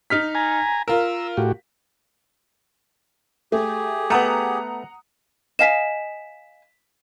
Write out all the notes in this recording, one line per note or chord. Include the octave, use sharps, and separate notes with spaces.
D#4 F6 B6
G#5 A#5
F4 A#4 E6
A2 F#4 G4
A3 G4 G#4
A3 B3 F#5 A#5 D#6
D#5 F5 G#5 B6 E7